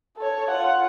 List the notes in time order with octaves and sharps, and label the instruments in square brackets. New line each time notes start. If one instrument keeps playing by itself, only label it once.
[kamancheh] A4 C#5
F4 F#5